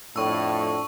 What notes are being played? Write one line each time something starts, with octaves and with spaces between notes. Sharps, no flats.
F2 A2 D4 C#6 E6